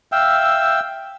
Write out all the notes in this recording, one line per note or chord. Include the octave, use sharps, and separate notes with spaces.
E5 F5 G5 E6